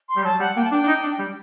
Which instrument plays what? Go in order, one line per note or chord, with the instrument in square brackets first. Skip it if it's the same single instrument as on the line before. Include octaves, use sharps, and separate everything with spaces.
[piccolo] C6
[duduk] G3
[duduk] F#3 [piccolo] A5
[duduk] G3 [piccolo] F#5
[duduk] A#3 [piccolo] G5
[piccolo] A5
[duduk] D4 [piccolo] G5
[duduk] D4
D#4
D4
G3